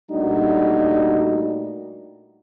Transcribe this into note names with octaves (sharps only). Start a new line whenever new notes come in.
A#2 G3 A3 D4 D#4 F#4